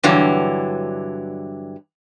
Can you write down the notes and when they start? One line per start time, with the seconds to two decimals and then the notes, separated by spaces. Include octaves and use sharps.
0.04 G2 D3 E3 F#3